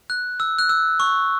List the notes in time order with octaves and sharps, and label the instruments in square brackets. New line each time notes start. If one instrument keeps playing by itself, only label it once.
[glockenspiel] F#6
E6
F#6
E6
C#6